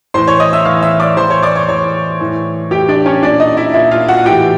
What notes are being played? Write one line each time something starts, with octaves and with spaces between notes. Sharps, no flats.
A2 E3 C5 C6
C#5 C#6
D#5 D#6
E5 E6
A2 E3 F5 F6
E5 E6
D5 D6
A2 E3 C5 C6
C#5 C#6
D5 D6
C#5 C#6
A2 E3 C#5 C#6
A2 E3
A2 E3 G4 G5
D4 D5
C#4 C#5
A#2 D4 D5
D#4 D#5
E4 E5
A#2 E4 E5
F4 F5
F#4 F#5
A2 E3 G4 G5